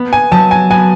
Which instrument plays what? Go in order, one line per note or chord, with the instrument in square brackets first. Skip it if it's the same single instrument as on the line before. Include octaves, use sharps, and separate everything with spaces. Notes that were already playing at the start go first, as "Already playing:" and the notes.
Already playing: [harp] B3
[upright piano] G#5
[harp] F#3 [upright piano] A5
[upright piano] G#5
[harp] B3 [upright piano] G#5